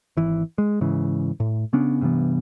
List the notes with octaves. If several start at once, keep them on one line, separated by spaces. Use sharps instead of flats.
G#1 E3
G#3
G#2 C#3 E3
A2
C#3 B3 C#4 D4
G2 C3 E3 B3